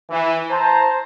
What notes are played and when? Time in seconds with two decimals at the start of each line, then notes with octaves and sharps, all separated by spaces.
0.10 E3
0.50 C5 A5 A#5